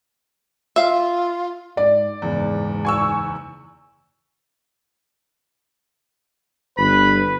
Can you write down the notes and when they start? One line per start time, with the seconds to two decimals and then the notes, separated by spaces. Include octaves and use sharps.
0.76 F4 E5 F5
1.77 G#2 D5
2.22 F#1 E2 G#2
2.85 G#5 C#6 E6
6.78 G1 B4 B5